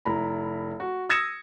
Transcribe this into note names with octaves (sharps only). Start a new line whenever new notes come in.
F1 E4 A#5 B5
F#4
D#6 E6 G#6 A#6 C#7 E7